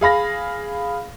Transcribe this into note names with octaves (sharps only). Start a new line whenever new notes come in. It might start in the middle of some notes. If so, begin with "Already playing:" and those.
G#4 F5 B5 A#6